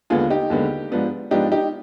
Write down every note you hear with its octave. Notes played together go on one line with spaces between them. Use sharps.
D#2 D3 G#3 B3 F4 G#4
D#4 G4
D#2 D3 G#3 B3
G#2 F3 B3 D4
G#2 F3 B3 D4 D#4 G4
D#4 G4